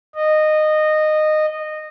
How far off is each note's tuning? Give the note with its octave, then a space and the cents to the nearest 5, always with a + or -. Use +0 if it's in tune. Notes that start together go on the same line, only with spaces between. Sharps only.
D#5 -15